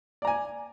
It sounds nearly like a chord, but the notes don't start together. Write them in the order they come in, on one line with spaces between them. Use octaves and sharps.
D5 A#5 G#5